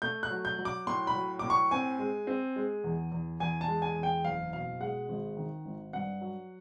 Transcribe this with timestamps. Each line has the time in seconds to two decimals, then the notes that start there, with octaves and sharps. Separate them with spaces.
0.02 A3 G6
0.23 F#6
0.31 F#3
0.45 G6
0.59 F#3
0.65 D6
0.87 A2 C6
1.07 B5
1.15 F#3
1.39 A2 D6
1.50 C#6
1.71 C4 G#5
1.99 G#3
2.27 C4
2.56 G#3
2.84 E2
3.12 E2
3.40 E2 G#5
3.61 A5
3.68 G#3
3.82 G#5
3.96 E2
4.03 G5
4.24 F#1 F5
4.53 B2 F5
4.80 G#3 F#5
5.09 G#1
5.37 D#3
5.65 G#1
5.93 G2 F#5
6.21 F#3